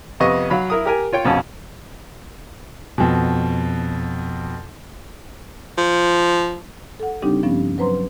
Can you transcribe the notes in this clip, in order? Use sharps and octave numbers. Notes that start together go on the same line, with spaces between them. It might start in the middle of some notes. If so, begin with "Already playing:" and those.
F2 C3 B3 D#5 C#6
F#3 F5 B5
E4 A#4 D#6
G4 A#4 G#5
F4 C#5 G5
A#1 F2 B2 C#4 A5
F2 B2
F3
A4 F#5
C#3 G3 C4 D4 D#4 G4
G2 F3 B3 C#4
F#3 B4 C5 A#5 C6